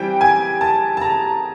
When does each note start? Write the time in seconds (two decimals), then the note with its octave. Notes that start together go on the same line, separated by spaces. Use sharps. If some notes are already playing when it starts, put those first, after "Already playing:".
Already playing: E3 G3 C4 G5
0.21 G#5
0.61 A5
0.97 A5
1.01 A#5